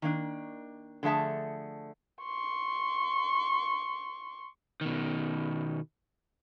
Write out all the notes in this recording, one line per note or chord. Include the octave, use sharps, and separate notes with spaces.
D#3 A#3 D4
D3 F3 A3 G#4 E5 A5
C6 C#6
B2 D#3